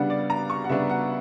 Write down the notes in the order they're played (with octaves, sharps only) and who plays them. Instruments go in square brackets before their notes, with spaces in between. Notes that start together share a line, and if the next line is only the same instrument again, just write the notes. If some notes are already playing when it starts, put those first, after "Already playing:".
Already playing: [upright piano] C#3 G3 B3 D4 F#5
D5
A#5
C#6
F#5
C#3 G3 B3 D4 E5
F#5